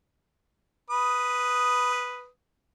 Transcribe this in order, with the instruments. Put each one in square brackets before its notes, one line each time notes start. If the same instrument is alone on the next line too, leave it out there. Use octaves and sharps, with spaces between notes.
[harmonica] B4 D#6